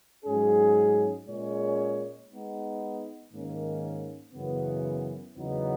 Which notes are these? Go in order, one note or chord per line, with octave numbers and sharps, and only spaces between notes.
G#2 F#3 C#4 G#4
A#2 G#3 C#4 G#4 C#5
G#3 B3 D#4
G#2 D#3 A#3 C#4
F#2 C#3 E3 B3
E2 C#3 F#3 B3 D#4